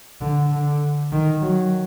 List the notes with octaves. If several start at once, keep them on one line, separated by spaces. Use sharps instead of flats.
D3
D3
D#3
F#3